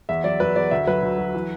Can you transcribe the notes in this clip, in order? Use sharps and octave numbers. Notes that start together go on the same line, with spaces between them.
E2 E5
F#3 D5
F#3 B4
E2 D5
D2 E5
F#3 B4
D2
F#3
E3